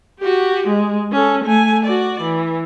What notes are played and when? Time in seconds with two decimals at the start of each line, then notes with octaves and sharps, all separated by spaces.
0.20 F#4 G4
0.67 G#3
1.12 C#4 A4
1.44 A3 G#5
1.85 F#4 D5
2.21 E3